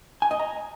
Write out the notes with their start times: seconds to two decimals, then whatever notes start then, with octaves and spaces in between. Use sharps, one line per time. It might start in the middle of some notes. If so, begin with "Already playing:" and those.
0.22 G#5
0.31 D#5
0.39 A#5